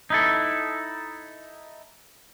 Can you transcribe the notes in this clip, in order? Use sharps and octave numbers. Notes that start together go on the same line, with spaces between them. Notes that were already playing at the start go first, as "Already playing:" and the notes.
D#4 E4 A4